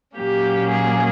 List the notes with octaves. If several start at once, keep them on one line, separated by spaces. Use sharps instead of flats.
A#2 F#3 A#3 C#4 G4
G#4